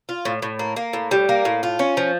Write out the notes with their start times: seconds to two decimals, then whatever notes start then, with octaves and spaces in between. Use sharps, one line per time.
0.09 F4
0.25 A2
0.42 A2
0.59 A#3
0.76 A#3
0.93 A2
1.11 G3
1.29 A#3
1.45 A2
1.63 F4
1.79 C#4
1.97 F3